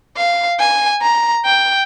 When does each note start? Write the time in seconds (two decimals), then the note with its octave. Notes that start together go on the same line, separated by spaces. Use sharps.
0.17 F5
0.59 G#5
1.02 A#5
1.45 G5